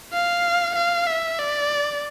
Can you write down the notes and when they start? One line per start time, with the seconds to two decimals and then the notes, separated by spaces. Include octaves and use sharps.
0.13 F5
0.76 F5
1.07 E5
1.39 D5